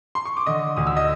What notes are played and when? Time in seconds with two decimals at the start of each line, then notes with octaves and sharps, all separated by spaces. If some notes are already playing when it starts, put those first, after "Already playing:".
0.15 C6
0.25 C#6
0.37 D6
0.46 D3 D#5 D#6
0.77 D2 D#6
0.87 E6
0.97 D#5 D#6